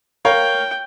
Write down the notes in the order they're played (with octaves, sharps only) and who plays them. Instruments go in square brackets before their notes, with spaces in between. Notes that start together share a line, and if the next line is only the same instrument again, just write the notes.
[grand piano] A#4 C#5 F5 [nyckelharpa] G5